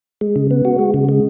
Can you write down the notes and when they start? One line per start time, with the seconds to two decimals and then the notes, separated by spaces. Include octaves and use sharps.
0.21 G#3
0.36 C#3
0.51 B3
0.65 F#4
0.79 G#3
0.94 C#3
1.09 G#3